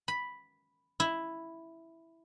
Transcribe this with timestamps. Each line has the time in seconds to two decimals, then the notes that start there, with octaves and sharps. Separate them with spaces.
0.08 B5
1.00 E4